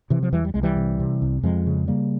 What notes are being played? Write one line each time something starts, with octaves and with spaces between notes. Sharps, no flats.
C3 E3
F3
E2 E3 G3
G3
C2 G#3
E3 G3
C3
C3
C2
F2 F3 G#3
C#3
C#3 G3 A#3